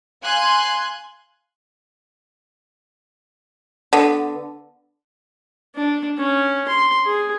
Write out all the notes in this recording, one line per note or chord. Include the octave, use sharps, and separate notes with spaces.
F5 G#5 C6 F#6 G#6
D3 B3
D4
C#4
C6
G#4